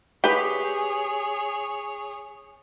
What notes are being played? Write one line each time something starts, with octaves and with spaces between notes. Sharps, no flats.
G4 G#4 B4 C#5